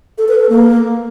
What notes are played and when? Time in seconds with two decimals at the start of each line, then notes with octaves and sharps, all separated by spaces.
0.18 A4
0.28 B4
0.39 A4
0.49 A#3